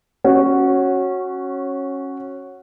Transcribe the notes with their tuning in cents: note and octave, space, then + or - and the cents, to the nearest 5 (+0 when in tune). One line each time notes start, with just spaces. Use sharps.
C#4 -15 F#4 +0